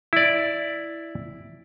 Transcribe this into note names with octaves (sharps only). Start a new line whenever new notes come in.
E4 D5